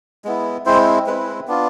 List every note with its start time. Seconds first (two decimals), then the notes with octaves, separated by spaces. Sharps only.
0.25 G#3 B3 E4
0.66 G#3 C4 E4 C5
1.07 G#3 C4 E4 B4
1.48 B3 D4 F4